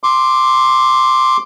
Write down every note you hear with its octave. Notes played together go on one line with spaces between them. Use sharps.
C6 D6